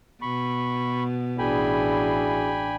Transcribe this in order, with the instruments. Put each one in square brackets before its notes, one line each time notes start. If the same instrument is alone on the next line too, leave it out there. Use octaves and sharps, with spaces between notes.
[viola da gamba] B2 [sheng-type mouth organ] B5 C#6
[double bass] A1 D4 [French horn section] E4 F#4 G#4 [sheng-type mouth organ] G5 G#5 B5